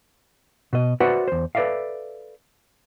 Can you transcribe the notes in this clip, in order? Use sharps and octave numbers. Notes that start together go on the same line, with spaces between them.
B2 D#5
F#4 B4 C5 D5 E5 F#5
E2 C5
A4 B4 C5 D5 E5 F5